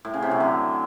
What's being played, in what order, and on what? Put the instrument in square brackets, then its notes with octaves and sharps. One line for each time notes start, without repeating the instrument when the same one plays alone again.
[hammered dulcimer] A2
C#3
C3
F#3
D3